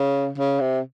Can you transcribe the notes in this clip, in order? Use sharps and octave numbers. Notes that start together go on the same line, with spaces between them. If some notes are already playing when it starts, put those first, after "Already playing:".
Already playing: C#3
C#3
C3